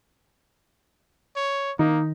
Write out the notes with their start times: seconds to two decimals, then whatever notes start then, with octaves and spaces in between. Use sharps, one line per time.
1.37 C#5
1.79 D#3 A#3 D#4